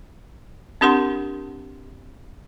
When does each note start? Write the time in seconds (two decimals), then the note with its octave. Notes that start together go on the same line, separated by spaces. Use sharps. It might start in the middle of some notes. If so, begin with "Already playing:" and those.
0.81 C4 D4 G4 A#4 F#5 C6